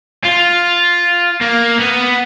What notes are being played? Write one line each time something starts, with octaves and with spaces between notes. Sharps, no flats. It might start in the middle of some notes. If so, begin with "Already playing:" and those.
F4
A#3
B3